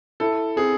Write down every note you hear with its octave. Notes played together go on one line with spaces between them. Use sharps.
E4 A4
C4 G#4